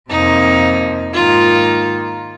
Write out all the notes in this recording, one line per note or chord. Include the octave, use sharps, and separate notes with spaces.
F2 C3 F3 A#3 D#4
G#2 D#3 A#3 F4